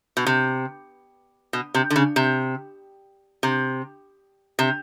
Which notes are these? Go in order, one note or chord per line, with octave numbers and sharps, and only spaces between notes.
B2
C3
B2
C3
D3
C#3
C3
C3
C3